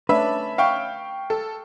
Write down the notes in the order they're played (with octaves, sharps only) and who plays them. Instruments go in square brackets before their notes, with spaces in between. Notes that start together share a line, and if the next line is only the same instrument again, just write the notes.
[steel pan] A3 D4 [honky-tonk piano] C#4 E5 B5 [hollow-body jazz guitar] B4
[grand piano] F5 G5 C#6
[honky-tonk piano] A4